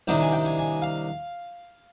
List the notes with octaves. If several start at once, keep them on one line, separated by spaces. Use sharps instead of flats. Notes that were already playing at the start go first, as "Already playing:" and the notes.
C2 C3 D#3 A#3 D4 G5
G#5
G5
G#5
G#5
F5